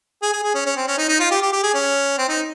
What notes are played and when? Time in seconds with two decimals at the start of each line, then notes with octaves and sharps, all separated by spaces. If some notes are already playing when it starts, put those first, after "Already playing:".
0.22 G#4
0.33 G#4
0.43 G#4
0.55 C#4
0.66 C#4
0.76 C4
0.88 C#4
0.98 D#4
1.09 D#4
1.20 F4
1.31 G4
1.42 G4
1.53 G4
1.63 G#4
1.74 C#4
2.18 C4
2.29 D#4